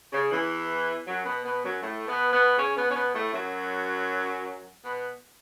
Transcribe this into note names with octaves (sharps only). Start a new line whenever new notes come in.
C#3
E2 E3
F#2 F#3
B2 B3
B2 B3
F#2 F#3
A2 A3
B2 B3
B2 B3
C#3 C#4
B2 B3
C#4
B2 B3
A2 A3
F#2 F#3
B2 B3